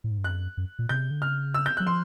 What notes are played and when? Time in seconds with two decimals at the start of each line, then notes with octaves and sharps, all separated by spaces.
0.04 A2
0.11 G#2
0.18 G2
0.24 F#2 F#6
0.57 F#2
0.79 A#2
0.89 C3 G6
1.11 D3
1.22 C#3 F6
1.54 E6
1.66 G6
1.77 F#3 F#6
1.87 F3 C6